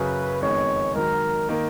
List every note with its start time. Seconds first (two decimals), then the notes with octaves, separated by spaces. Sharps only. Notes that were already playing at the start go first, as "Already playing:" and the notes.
Already playing: F#2 C#3 F#3 C#4 G#4 B4
0.42 F2 D#3 G#3 B3 D#4 C#5
0.95 G#1 G#2 D#3 F#3 A#4
1.49 D#3 A#3